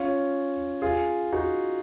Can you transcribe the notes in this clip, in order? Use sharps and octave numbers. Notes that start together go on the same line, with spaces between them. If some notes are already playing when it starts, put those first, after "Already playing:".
Already playing: C#4 F4
F4 G#4
D#4 F#4